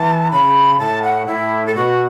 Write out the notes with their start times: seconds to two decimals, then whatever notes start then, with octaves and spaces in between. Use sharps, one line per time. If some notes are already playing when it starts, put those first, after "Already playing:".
Already playing: E3 A5
0.31 C#3 B5
0.78 A2 A5
1.03 F#5
1.26 A2 E4
1.66 A4
1.75 B2 F#4